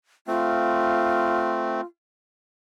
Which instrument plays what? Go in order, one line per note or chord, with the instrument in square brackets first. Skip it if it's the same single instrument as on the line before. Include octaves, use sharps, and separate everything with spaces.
[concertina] A3 C4 [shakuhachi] F4